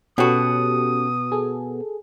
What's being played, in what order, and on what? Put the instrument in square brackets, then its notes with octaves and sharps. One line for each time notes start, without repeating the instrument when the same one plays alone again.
[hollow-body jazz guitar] B2 F#4 [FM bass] B3 [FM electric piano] C#4 G4 A4 [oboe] D#6
[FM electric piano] G#4 A4